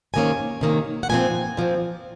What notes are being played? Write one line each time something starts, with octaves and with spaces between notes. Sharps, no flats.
C3 D#3 A#3 C#4 G#5
C3 D#3 A#3 C#4
F#5
A#2 F3 C4 G#5
A#2 F3 C4